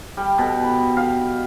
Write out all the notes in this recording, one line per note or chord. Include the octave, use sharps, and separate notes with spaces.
G3
B2
B5
F5